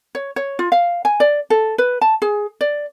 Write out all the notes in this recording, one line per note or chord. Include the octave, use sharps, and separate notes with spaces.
C#5
C#5
F4
F5
G#5
D5
A4
B4
A5
G#4
D5